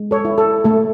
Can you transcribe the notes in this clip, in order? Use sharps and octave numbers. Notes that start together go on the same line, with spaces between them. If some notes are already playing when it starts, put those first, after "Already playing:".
Already playing: G#3
A4 C#5
E4
A4
A3 A4